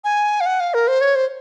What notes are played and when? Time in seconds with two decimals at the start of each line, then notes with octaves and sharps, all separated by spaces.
0.04 G#5
0.41 F5
0.46 F#5
0.60 F5
0.74 A#4
0.88 C5
1.01 C#5
1.15 C5